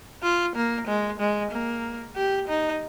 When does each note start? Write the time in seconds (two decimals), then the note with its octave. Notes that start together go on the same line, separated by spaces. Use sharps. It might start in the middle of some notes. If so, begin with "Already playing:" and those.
0.23 F4
0.56 A#3
0.87 G#3
1.20 G#3
1.52 A#3
2.16 G4
2.48 D#4